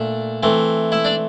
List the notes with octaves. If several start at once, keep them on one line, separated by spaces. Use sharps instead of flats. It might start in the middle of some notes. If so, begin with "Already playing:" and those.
Already playing: A#2 A3 D4
E3 A3 C4
E4 E5
D4 D5